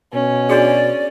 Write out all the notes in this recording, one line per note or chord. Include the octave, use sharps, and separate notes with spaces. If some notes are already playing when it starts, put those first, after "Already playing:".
B2 C#4
D4 F#4 G#4 D5